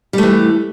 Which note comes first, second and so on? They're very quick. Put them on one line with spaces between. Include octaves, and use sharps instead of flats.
G3 A3 E3